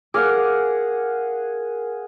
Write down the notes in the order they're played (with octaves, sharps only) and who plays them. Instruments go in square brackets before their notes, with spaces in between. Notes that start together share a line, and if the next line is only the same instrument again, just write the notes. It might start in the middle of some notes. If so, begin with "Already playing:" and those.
[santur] G#4 F5 F#5 [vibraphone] A#4 [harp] D6 F6